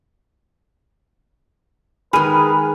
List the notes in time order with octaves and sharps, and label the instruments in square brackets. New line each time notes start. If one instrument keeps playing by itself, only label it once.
[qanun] D#3 G#3 [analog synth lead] G#4 [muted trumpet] B4 [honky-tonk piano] B5 F6 D#7